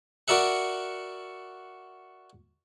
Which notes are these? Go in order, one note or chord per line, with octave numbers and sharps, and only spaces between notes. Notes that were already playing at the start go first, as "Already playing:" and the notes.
F#4 A#4 D5 E5 F#5